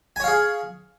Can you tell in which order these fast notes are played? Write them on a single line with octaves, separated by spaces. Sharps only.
G#5 C#5 F5 G#4